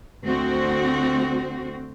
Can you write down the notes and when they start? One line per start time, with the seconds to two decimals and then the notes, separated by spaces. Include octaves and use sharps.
0.24 D2 C4 F#4